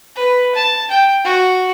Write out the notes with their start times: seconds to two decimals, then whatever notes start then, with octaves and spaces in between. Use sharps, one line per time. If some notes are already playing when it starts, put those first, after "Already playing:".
0.16 B4
0.55 A5
0.91 G5
1.24 F#4